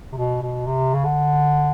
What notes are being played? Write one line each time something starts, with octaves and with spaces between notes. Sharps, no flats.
C3
B2
B2
C3
C#3
D3